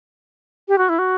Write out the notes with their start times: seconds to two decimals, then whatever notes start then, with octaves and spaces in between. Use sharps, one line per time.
0.68 G4
0.78 F#4
0.89 E4
0.99 F#4